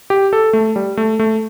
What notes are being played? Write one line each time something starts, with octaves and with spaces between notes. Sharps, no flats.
G4
A4
A3
G3
A3
A3